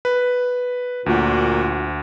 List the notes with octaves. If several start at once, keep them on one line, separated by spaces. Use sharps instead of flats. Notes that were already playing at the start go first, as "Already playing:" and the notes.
B4
D2 A#2 F#4